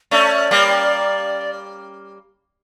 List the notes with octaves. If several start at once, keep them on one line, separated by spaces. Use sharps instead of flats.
A3 C#4 D5
G3 A#3